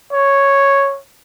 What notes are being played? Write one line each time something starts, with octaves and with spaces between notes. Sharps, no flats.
C#5